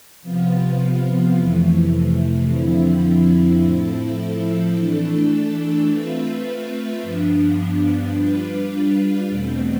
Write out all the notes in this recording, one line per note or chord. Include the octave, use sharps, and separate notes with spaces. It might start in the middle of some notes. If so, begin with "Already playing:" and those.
C3 F3 B3 F4
F2 C3 E3 A3
F2 D3 F3 C4 E4
A2 F3 C4 E4 A4
E3 A3 D4 A4
A3 C4 F4 B4 E5
G2 F3 B3 D4
G3 D4 F4 B4
E2 B2 A3 C4